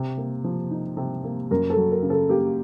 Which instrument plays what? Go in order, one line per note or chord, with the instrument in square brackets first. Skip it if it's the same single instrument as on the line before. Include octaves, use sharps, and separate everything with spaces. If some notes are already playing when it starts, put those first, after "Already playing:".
Already playing: [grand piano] C3
A#3
F3
D#4
C3
A#3
[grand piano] F#2 [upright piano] A#4
[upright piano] A4
[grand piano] F#3
[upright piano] A#4
[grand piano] C#3
[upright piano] A4
[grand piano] A#3 [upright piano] G4